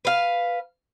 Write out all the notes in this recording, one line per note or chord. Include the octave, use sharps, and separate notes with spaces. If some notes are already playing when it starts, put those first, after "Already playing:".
B4 F5